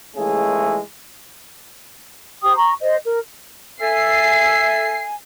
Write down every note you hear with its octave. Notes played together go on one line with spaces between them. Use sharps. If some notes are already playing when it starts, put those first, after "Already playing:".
D#2 C#3 E3 G#3 A3 G#4
G4 C5 G5 D#6
A#5 C#6
C5 D#5
A#4
A4 E5 G#5 C7